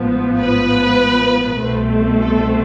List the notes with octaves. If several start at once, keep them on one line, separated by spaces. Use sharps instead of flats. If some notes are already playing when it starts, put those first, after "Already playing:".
Already playing: A1 G#2 F3 B3
B4
C2 B2 A3 C4
A4